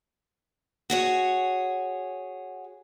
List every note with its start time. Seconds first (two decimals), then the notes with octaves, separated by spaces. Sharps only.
0.90 F#4 G#4 C#5